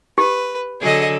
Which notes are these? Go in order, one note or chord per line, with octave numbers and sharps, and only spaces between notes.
G4 B4
D3 F#3 G#4 A4 D#5